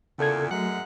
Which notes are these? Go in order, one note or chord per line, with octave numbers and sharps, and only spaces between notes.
E2 A#2 C#3 A4 G#6
F#2 F#3 G#3 A3 F#5